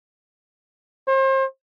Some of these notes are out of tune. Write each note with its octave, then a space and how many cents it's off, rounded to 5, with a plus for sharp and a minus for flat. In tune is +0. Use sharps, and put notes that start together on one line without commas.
C5 +35